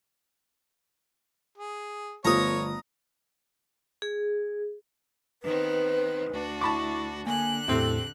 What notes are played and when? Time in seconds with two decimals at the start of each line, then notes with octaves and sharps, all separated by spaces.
1.58 G#4
2.25 G1 F3 A3 B3 C#5 A#5 D#6
4.02 G#4
5.43 D#3 B3 C4 B4
6.29 D2 D4 F#4
6.61 E4 A5 B5 C#6 D6
7.27 D3 A#3 G#5 F#6
7.68 E2 A2 C3 C4 A4